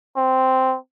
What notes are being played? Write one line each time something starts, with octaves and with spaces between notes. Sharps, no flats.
C4